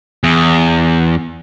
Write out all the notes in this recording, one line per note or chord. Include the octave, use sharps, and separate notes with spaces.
E2